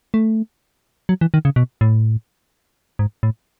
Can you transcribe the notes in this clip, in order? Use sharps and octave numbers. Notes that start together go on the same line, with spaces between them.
A3
F#3
E3
D#3
C#3
B2
A2
G#2
A2